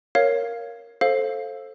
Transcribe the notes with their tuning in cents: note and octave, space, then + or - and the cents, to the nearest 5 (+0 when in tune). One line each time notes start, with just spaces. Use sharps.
A#4 +0 C#5 +0 F5 +0
A4 +0 C5 +20 F5 +0